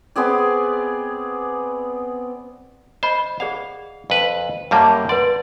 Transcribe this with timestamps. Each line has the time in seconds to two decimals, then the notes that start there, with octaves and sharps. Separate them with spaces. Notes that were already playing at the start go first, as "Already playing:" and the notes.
0.16 B3 C4 G#4 D5
3.03 C5 D#5 B5
3.40 G#4 D5 F5 F#5
4.10 F2 B4
4.71 F#2 G3 A#3 F5 A5 C#6
5.09 B4 D5 F#5 C6